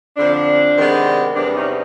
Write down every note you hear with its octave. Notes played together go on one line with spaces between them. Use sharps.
F2 D3 F3 D4
C3 D#3 G#3 B3
E2 C3 E3 G3 B3 D4
C#4 D#4